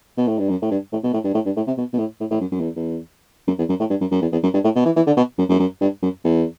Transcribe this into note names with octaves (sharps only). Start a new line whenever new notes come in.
B2
A2
G2
F#2
A2
G2
A2
B2
A2
G2
A2
G2
A2
C3
B2
B2
A2
A2
A2
F#2
F#2
E2
E2
F#2
E2
F#2
A2
G2
F#2
F#2
E2
E2
F#2
G2
A2
B2
E3
E3
D3
B2
F#2
F#2
F#2
G2
F#2
E2